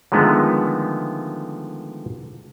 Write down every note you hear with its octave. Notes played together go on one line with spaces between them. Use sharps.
D3 D#3 F3 G#3 A3 B3